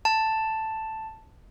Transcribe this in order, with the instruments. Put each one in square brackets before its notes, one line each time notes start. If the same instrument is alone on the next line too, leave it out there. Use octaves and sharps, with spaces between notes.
[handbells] A5